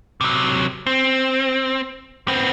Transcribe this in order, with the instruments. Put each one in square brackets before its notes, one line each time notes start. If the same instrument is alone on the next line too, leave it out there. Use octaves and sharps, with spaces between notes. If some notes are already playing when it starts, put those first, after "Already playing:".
[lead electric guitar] C3 F#3
C4
B3 C4